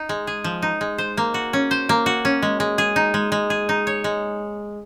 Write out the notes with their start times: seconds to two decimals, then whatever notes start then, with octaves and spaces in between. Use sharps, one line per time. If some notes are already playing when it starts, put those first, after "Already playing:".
Already playing: D#4
0.09 G#3
0.27 G#4
0.44 F3
0.62 D#4
0.81 G#3
0.98 C5
1.17 A#3
1.34 F#4
1.53 C#4
1.71 C5
1.89 A#3
2.06 F#4
2.25 C#4
2.42 G#3
2.60 G#3
2.78 G#4
2.96 D#4
3.14 G#3
3.32 G#3
3.50 G#4
3.69 D#4
3.87 C#5
4.04 G#3